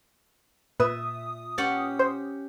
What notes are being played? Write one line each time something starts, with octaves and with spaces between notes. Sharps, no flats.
A#2 B4 E5 D#6
C#4 G4 F#5 A6
C5